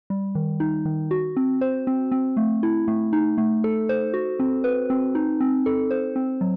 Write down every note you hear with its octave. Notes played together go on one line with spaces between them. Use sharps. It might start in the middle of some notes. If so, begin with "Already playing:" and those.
G3
D#3
D#4
D#3
F#4
C4
C5
C4
C4
A3
E4
A3
D#4
A3
A4
C5
F#4
C4
B4
C4
D#4
C4
A4
C5
C4
F#3